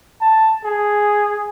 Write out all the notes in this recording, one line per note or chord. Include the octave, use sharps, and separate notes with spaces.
A5
G#4